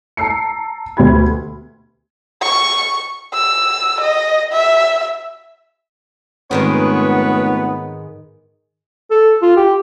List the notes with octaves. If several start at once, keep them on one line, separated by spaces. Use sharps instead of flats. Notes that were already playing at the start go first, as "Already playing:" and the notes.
A5 A#5 E6 C7 C#7
D2 B2 G4 B5 G#6
C#6
E6
D#5
E5
F1 G#2 D#3 G#3 B3 B4 C#5
A4
F4
G4